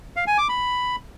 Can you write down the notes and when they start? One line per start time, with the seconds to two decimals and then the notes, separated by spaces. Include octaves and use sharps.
0.16 F5
0.27 G#5
0.38 D6
0.49 B5